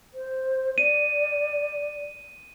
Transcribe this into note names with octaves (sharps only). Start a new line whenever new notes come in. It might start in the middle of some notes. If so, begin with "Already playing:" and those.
C5
D5 D#7